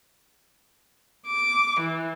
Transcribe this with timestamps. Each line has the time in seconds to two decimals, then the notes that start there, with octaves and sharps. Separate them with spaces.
1.28 D6
1.80 E3